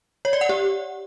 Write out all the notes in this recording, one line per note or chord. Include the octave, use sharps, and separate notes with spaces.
C#5
D5
F#5
G4